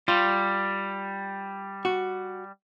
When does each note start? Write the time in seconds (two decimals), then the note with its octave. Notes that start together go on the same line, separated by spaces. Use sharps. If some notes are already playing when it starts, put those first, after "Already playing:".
0.08 G3 F4
1.85 F#4